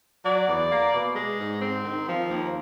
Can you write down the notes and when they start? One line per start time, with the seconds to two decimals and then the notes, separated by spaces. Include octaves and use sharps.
0.24 F#3 D5
0.47 E2
0.70 A#3
0.93 B2
1.15 G#3
1.39 G#2
1.61 C4
1.84 D#3
2.07 F3
2.29 D#2